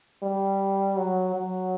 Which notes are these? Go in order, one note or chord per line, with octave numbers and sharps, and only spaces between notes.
G3
F#3
F#3